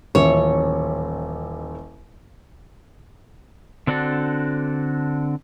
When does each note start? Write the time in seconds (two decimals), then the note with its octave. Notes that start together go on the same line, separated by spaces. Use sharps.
0.15 D#1 A1 C#5 E5
3.87 D3 C4 D4 F#4 A4